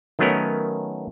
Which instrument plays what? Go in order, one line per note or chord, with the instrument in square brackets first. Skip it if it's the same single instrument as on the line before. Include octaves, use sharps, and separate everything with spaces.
[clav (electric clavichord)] D#3 F#3 A3 B3 C#4 A#4